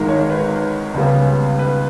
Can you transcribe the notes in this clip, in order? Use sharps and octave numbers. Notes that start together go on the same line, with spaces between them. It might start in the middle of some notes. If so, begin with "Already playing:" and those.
Already playing: G#1 G#2 D#3 G#3 G#4 A#4
C#5
B4
C#2 C#3 G3 B3
B4